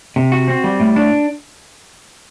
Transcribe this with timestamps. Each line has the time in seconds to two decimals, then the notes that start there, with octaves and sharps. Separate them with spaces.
0.16 C3
0.32 F#4
0.48 C4
0.64 G3
0.80 A2
0.96 D4